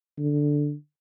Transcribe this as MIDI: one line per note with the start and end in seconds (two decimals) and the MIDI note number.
0.18 0.73 50